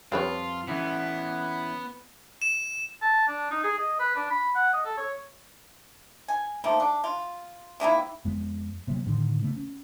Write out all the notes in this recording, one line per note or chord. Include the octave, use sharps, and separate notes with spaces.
F2 G3 F4 B4 C#5
E3 B3 C#4 E4
E7
A5
D4
D#4
G#4
D#5
B4
D4
B5
F#5
D#5
A4
C#5
G#5
D#3 F3 A3 A#3
D4
F4
C3 D#3 A#3 E4
F2 G#3 B3
C3 F#3 A#3 B3
A2 D3 D#3 D4
C#3 A3 B3
C#4